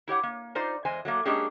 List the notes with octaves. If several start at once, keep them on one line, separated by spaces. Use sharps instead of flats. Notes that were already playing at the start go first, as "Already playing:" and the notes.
E4 G4 C#5 F#5
A#3
D#4 F4 C5 D5
E2 G#3 C5 G#5
F#3 A3 A#3
G#3 A#3 C#4 D4 G4 G#4